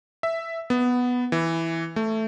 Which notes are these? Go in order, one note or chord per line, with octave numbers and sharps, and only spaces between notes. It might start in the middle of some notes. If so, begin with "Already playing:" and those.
E5
B3
E3
A3